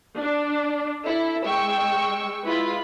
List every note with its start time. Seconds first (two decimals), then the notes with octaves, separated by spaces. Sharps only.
0.20 D4
1.05 E4 A4
1.45 G#3 G5 C#6 E6
2.46 G#3 E4 F4 B4 B5